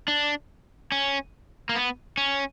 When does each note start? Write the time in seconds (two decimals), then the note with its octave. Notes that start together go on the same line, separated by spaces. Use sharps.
0.08 D4
0.92 C#4
1.69 A#3
1.76 B3
2.17 C#4